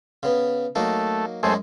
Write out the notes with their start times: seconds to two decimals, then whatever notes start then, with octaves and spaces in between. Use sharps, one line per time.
0.23 C#3 B3
0.75 F#3 A3 A#3 D#4
1.43 F#2 F#3 G#3 A3 G#4 C5